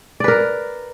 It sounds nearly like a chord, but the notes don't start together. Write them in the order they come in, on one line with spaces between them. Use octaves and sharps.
D5 B4 A#4